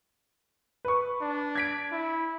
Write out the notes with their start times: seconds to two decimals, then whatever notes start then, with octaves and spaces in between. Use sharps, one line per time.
0.85 B4 C#6
1.21 D4
1.55 G#6 B6 D7
1.92 E4